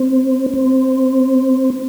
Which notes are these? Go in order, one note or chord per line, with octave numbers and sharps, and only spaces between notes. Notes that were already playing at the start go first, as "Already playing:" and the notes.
Already playing: C4
C4